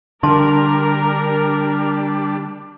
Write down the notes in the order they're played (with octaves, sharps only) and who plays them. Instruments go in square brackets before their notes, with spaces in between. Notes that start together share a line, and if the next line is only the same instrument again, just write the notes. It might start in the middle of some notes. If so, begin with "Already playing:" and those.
[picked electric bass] D3 [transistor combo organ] G3 D4 [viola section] A#4 [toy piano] A5 C6